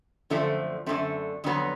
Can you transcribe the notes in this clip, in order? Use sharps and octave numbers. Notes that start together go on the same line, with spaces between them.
F#2 D3 F3 A3 C4
F#2 D3 F3 A3 C4
F2 D3 F#3 B3